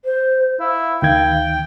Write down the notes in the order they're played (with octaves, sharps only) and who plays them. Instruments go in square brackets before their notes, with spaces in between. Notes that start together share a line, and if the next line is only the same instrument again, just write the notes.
[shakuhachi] C5
[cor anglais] E4 [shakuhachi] F5
[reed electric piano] D2 D#3 G#6 [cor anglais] G5